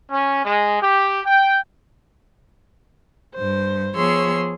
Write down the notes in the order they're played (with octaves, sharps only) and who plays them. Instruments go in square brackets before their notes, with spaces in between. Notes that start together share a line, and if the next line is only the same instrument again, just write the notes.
[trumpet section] C#4
G#3
G4
G5
[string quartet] G2 C5
F3 B3 G#4 C#5 C6 E6